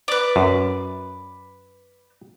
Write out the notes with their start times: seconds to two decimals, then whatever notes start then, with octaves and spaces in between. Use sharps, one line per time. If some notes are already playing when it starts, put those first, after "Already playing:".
0.08 B4 D5
0.36 F#2